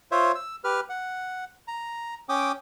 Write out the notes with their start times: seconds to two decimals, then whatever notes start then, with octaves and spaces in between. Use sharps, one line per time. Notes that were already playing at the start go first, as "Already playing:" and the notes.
0.12 F4 C5 C#5 E5
0.35 E6
0.64 G4 B4 F6
0.89 F#5
1.68 A#5
2.29 C#4 G5 D6 D#6